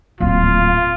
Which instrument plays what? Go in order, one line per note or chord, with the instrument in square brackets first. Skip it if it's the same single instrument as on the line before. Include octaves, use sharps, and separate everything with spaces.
[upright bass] D1 A#2 [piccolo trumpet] F4 [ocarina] F5